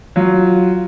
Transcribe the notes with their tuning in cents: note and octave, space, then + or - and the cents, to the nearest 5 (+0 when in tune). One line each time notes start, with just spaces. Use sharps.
F#3 +0 F4 +0